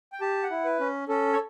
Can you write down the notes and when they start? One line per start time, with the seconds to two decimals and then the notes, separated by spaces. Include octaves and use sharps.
0.12 G5
0.21 G4 A5
0.43 F#5
0.50 E4
0.65 B4
0.80 C#4
1.08 C#4 A4
1.33 C#5